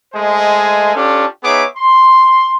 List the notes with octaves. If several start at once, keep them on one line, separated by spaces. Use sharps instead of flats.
G#3 A3 C5 D#5 G#5
C#4 D4 F4 G4 A4
B3 D#4 G#4 C#5 E5 D6
C6